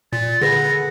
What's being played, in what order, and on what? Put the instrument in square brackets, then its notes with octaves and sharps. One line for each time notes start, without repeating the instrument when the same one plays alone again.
[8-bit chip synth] A#2 [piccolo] A6
[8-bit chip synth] D3 [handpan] G#4 B4 F#5 [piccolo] A#6